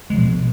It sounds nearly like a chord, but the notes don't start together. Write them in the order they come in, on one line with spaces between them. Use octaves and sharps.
G#3 F3 B2